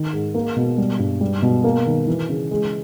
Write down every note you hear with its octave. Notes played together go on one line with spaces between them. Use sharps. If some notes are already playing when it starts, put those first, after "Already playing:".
Already playing: D#3
G#2
A#3
B2
G3
G2
G3
B2
A#3
D#3
E3
C#3
G#3